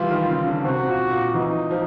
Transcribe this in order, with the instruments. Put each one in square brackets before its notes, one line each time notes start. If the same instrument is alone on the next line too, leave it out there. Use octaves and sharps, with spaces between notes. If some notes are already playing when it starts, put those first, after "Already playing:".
Already playing: [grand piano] E3 G3 [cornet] F4
[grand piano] D#3
C#3
D3
[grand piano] C3 [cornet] F#4
[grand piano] A#2
A#2
[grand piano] E3 [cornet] D#4
[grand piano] F3